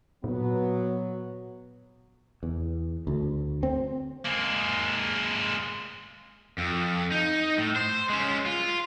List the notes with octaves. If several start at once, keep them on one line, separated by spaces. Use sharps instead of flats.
A#2 F#3 B3
E2
D2
C4
G#3 A#3
F2
D#4
A2
C5
G#3 C#4
F4